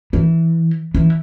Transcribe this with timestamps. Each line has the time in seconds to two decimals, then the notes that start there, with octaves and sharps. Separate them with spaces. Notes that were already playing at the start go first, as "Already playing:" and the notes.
0.13 E3
0.95 E3